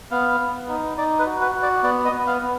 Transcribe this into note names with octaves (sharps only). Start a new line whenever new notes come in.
B3 F5
B3
D#4
D#4 D5
B4
F#4
B4
F#4
D5
B3 D5
D#5
B3
F5
B3